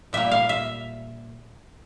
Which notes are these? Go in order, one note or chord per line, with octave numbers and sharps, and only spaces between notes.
A#2 G3 A#3 E5
F5
E5